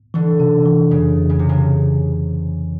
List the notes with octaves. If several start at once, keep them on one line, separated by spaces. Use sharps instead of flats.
D3 E3
C3
E3
F2 C#3
F2
C#3
C3
C#3